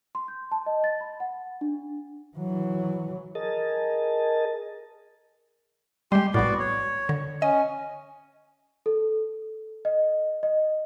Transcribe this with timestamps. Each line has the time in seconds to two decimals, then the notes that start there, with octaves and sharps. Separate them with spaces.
0.15 C6
0.28 G6
0.51 A5
0.66 D#5
0.84 A6
1.01 B5
1.20 F#5
1.61 D4
2.37 E3 F#3
3.35 G#4 A#4 D#5 A5
6.12 G3 G#3 G4 C6
6.34 A#1 A2 B3 F#4 D5
6.60 C#5
7.09 D3
7.42 C#4 D#5
8.86 A4
9.85 D#5
10.43 D#5